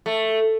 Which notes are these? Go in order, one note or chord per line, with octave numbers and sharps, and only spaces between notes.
A3